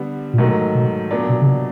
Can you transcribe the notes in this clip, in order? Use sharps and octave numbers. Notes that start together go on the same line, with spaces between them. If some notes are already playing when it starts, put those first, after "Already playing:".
Already playing: D3 G3 B3
A#2
G#2 B2 D#3 F#3 A3
B2
A#2 F#3 B3 D4
B2
C#3
C3